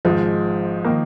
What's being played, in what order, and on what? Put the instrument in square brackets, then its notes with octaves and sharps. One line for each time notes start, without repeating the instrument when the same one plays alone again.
[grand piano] G#1 G#2 G#3 [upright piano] F3
[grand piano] D#3 A#3